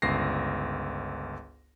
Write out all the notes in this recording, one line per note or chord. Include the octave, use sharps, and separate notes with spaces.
G1 C#2 A#6 C7